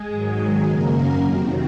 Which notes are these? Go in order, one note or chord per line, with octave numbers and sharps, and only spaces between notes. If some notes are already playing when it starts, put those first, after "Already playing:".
Already playing: G#3 G#4
G#2 D#3 F#3
F#2 C#3 F#3 A#3 A#4
F2 C3 D#3 F#3 C4